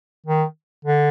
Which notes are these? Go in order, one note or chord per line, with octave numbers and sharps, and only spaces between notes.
D#3
D3